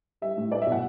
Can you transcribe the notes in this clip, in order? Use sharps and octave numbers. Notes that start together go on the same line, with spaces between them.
G3 E5
A2
A3 D5
E5
B2
F#5